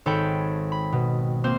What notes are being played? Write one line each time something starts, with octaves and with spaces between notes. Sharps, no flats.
G#1 A4 C#5 G5 B5
B5
B2
A#3 C4 C5